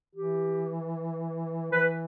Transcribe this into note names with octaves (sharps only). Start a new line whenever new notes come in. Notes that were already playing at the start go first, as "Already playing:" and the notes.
E3 G4
E3 B4